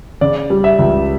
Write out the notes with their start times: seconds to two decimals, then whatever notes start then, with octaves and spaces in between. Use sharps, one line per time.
0.21 C#3 D5
0.50 G3
0.64 E5
0.79 C#2